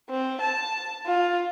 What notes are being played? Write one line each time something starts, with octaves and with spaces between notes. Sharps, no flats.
C4
A5
F4